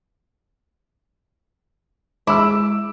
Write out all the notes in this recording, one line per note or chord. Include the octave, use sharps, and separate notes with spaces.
G#3 E4 D6 E6